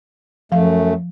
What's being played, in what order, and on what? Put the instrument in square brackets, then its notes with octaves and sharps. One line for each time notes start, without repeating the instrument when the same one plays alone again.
[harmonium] F#2 A3 [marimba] F3 F5